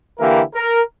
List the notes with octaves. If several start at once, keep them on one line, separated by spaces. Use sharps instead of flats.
D3 E3 A#3 E4 G4 A#4
A#4